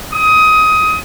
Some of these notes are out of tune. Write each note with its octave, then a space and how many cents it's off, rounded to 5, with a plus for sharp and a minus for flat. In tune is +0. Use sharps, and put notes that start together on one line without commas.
D#6 +20